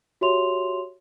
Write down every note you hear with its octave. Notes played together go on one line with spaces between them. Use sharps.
F#4 G4 C#5 E5 C6 F7